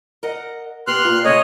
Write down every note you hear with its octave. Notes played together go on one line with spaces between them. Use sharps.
A#4 D#5 F#5
B3 G4 C6 F6 F#6
A#2 F4
C#3 A3 C#5 D#5